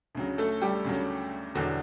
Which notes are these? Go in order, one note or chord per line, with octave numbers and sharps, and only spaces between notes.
D2 C#3 F#3
A3 A4
G3 G4
D2 C#3 F#3
E1 E2 D3 F#3